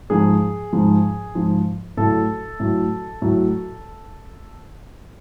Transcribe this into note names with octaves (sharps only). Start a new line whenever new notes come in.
G#2 F3 G#4
G#2 F3
G#2 F3
A2 F#3 A4
A2 F#3
A2 F#3